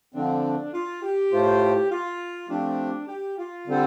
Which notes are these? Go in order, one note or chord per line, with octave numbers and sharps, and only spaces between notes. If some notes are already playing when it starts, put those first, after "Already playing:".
D3 F3 A3 C4 D4
F4
G4
A2 A3 F4 C5
F4
F3 A3 C4 D4 G4
G4
F4
D3 G3 C4 A4 C5